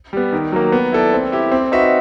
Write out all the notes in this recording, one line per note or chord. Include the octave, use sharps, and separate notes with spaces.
G3 B3
D#3
F#3 A#3
B3
E4 A4 D5
C4
E4 G4
C4
D#4 F#4 B4 E5